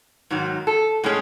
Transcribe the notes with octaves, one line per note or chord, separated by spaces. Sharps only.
G#2 D#3 F#3
A4
A2 G#3 C#4